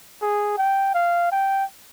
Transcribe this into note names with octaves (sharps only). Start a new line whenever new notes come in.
G#4
G5
F5
G5